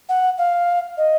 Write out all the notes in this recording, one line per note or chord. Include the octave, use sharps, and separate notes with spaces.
F#5
F5
D#5